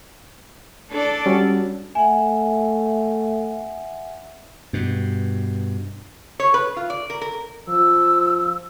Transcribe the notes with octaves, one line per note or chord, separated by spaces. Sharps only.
D4 A4 D5
G3 C#4 F#4
A3 E5 F#5 G#5
G2 B2
C#5
B4
F4
D5
A#4
A#4
F3 E6